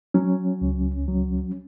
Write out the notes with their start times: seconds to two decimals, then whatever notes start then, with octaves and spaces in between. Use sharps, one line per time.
0.14 F#3 C#4
0.61 C#2
1.08 F#3